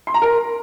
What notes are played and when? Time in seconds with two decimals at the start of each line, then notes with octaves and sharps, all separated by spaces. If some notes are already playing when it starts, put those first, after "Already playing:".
0.07 C6
0.14 A#5
0.22 A#4